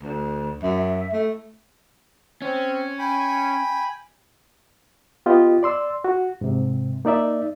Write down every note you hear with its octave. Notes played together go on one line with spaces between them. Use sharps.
D2
F#2 E5
A3
C4 C#4
G5 G#5 B5
B3 F4 G4 D#5
D5 C6 E6
F#4
G#2 C3
A#3 D#4 D5 E5